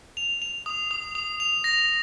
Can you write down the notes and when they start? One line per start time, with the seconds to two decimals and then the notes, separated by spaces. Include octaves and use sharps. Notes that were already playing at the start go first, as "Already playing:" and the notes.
0.17 F7
0.42 F7
0.66 D#6
0.91 D#6
1.15 D#6
1.40 F7
1.64 A#6